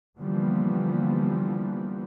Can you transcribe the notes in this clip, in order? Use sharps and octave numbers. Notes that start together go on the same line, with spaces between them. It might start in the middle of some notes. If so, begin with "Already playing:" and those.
D3 E3 F3 G3 A#3 B3